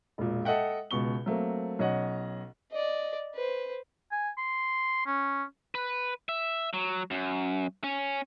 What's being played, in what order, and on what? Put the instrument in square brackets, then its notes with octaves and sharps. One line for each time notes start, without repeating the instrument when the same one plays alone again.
[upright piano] E1 A#2
A4 D#5 E5 F#5 G5
C#2 B2 C#6 G7
F#3 A3 A#3 C4
B1 C#4 C#5 D#5 F#5
[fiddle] D5 D#5
B4 C5
[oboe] G#5
C6
C#4
[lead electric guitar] B4
E5
F#3
F#2
C#4